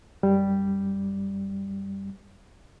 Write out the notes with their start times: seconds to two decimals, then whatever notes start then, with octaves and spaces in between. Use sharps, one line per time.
0.23 F#2 G3